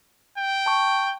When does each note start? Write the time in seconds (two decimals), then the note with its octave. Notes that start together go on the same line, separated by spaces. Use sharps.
0.37 G5
0.66 A5 C#6